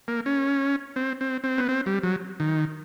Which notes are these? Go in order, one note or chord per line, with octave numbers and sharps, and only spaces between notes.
A#3
C#4
C4
C4
C4
B3
C4
G3
F#3
D#3